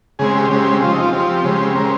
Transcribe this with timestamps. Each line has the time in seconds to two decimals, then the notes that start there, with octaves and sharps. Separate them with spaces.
0.19 C#3 G#3 C4 G#4
0.35 G4
0.51 C#3 G#3 C4 G4
0.82 F3 C4 F4
0.92 D#4
1.02 F4
1.13 F3 C4 G4
1.44 C#3 G#3 C4
1.76 C#3 G#3 C4 A#4